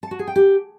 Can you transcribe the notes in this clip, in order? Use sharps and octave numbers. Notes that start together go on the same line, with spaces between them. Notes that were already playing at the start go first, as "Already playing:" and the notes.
A5
F#4
G#4
G5
G4